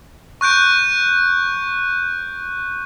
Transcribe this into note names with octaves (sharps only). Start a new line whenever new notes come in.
C#6 F#6 G6 D7